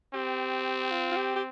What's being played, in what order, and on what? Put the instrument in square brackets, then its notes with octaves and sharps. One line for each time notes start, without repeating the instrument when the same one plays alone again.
[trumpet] C4 [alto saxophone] G4
[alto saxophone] F4
F4
G4
G4